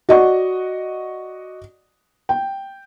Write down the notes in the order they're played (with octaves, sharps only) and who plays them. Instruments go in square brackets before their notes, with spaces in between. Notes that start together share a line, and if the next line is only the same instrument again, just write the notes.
[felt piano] F#4 D5 D#5 F#5 C#6
G5